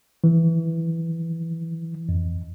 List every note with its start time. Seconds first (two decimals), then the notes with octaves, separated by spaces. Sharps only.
0.24 E3
2.09 F2